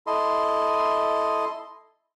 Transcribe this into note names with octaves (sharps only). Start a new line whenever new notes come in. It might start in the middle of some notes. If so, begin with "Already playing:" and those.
E4 A4 D#5 C6